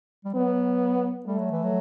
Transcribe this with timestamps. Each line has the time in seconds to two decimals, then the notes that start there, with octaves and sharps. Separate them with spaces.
0.25 G3
0.34 F#3 B3
1.26 G3 A3
1.38 F#3
1.51 E3
1.63 F#3